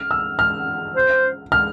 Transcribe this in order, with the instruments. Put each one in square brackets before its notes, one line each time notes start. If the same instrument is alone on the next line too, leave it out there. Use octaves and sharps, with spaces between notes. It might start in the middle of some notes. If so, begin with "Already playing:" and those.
Already playing: [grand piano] F6
E6
F6
[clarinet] C5
[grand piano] F6